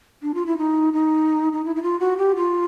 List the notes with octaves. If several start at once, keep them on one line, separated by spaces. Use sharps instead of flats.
D4
F4
E4
D#4
D#4
D#4
E4
E4
F4
F#4
G4
F4